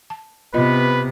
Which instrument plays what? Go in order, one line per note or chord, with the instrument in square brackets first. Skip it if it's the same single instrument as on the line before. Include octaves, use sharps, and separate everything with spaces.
[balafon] A5
[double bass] C3 [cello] B3 [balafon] F4 D#5 [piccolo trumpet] B4